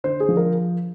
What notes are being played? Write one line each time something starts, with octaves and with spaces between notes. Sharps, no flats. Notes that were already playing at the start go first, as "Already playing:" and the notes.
D3 C5
G#4
F3
A#4